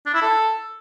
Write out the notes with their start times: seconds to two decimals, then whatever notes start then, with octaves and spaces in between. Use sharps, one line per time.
0.06 D4
0.14 E4
0.22 A4